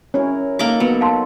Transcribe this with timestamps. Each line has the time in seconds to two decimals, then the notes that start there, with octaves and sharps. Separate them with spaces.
0.14 F#3 C#4 E4 A#4 C#5
0.59 A#3 D#4 A4 A#4 D6
0.80 F#3 B3 B4
1.01 F5 A5 C6